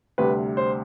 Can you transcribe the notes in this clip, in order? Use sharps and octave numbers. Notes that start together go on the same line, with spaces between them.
D2 C3 G3 B4
C5